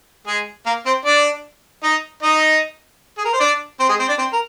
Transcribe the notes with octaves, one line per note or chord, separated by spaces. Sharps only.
G#3 G#4
A#3 A#4
C4 C5
D4 D5
D#4 D#5
D#4 D#5
G#4
A#4
C5
D4 D5
C4 C5
G#3 G#4
C4 C5
D4 D5
C4 C5
A#4